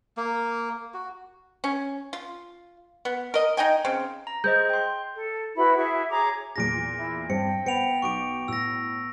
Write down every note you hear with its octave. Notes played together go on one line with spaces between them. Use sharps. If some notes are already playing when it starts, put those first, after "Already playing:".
A#3
F#4
C#4
F4
B3
A#4 D#5
D#4 D#5 G5 G#5
C#3 C4
A#5
G#4 C5 D#5 G6
G5 C6
A4
E4 F#4 B4 B5
E4 F#4 G#4 E5
G#4 C#5 A#5 D6
E2 A#2 G#4 A#6 D7
E4
G2 C4 G5 C#7
B3 C#7 D7 F7
B1 D#4 C#6 D6 D7
A2 E6 A#6